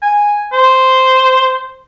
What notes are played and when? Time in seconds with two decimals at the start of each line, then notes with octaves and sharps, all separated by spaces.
0.02 G#5
0.52 C5